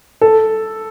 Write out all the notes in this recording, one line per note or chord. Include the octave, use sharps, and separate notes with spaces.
A4